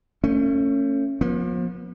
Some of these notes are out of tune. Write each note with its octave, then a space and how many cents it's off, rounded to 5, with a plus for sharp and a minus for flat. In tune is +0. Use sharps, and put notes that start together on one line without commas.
A3 +35 C#4 -10
F3 +35 B3 -45